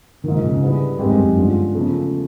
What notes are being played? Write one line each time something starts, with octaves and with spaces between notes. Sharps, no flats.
G#2 D#3 F3 A#3
D3
C3
C#3
D3 G3 B3 E4 G#4
G#2 D#3 G#3 C4 D#4 G4
G2
F#2
G2 D3 F3 G#3 C#4 F4
E2 C#3 F3 A3